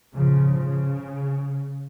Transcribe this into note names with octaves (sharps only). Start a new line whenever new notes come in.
A#1 G#2 C#3 F3
C#3